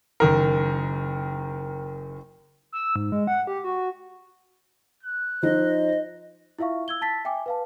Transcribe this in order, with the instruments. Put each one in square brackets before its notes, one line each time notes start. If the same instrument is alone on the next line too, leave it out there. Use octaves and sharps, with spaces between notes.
[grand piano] F#1 D#3 A#4
[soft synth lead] E6
G#2
G#3
F#5
G4
F#4
[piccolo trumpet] F#6
[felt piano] F3 D#4 [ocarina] C5 [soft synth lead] D#5
[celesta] E4 F4 E5 F5 C#6
E6 G#6 G7
A5 A6 B6
E5 G5 G#5 D6
B4 F5 A5